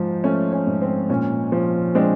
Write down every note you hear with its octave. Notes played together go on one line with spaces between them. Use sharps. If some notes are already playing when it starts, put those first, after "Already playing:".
Already playing: G#2 F3
A3 C#4
C#4
G#2
C4
A#2 C#4
F3
G#3 C4 D4